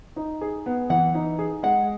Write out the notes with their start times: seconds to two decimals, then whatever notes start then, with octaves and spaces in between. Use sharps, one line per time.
0.16 D#4
0.41 G#4
0.66 B3
0.90 E3 F#5
1.15 D#4
1.39 G#4
1.63 G#3 F#5